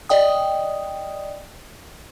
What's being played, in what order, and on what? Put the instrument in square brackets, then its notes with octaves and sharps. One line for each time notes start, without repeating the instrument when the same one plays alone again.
[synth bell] D5 D#5 G5 D#6